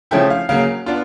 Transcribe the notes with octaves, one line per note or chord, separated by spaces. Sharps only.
C#3 F3 A3 C#4 E4 G5
F5
C#3 F#3 A#3 F5
B3 D4 F4